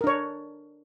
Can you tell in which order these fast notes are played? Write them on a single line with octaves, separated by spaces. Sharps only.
A#4 D4 C#5